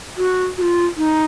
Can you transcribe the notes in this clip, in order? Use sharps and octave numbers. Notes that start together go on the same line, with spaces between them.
F#4
F#4
F4
D#4